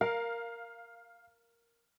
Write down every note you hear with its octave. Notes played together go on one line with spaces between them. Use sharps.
A#4 F5